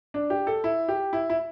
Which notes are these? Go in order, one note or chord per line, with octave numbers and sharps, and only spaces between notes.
D4
G4
A4
E4
G4
E4
E4